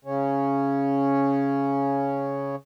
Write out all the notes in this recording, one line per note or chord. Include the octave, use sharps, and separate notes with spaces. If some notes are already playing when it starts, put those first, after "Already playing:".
C#3 C#4